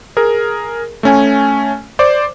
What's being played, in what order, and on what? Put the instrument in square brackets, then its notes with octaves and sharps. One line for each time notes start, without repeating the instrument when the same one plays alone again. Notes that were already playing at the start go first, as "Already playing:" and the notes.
[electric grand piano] G#4 A#4
A3 C#4 G#5
C5 D5 D6